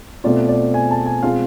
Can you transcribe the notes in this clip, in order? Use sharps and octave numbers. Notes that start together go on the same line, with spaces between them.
B2 A3 C4 F4 D5
D5
G#5
A5
G#5
B2 G#3 C4 F4 F5